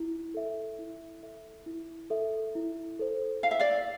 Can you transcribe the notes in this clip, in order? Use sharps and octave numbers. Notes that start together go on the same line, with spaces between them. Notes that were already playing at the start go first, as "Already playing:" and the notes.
Already playing: E4
A4 E5
E4
A4 E5
E4
A4 E5
E4
A4 C5
E4 F5
E5
D5 F5